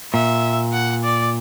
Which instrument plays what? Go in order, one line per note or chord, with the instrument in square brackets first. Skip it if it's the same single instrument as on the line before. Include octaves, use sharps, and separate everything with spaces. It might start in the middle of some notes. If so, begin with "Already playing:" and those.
[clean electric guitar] A#2 [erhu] E5
[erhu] F#5
D5